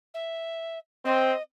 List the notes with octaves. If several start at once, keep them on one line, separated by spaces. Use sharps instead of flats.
E5
C4 D#5